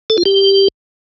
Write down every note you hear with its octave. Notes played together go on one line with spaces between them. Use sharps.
A4
F4
G4